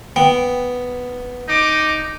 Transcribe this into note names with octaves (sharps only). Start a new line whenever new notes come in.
B3 G5
D#4 D6